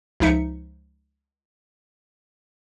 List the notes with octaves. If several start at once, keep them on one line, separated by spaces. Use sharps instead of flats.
C#2 F3 D#4 E5 C#7